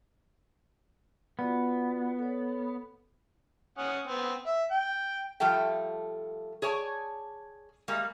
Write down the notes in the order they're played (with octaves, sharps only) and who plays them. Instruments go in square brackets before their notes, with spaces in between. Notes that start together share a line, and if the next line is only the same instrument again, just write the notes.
[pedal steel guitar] B3 [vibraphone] F4 F#4 D5
[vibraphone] A4 C#5
[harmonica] C#4 F#5 D#6
B3 C4
E5
G5
[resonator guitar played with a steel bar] F3 G3 A3 A4 G5
G#4 C#5 D5 A5
G3 G#3 A#3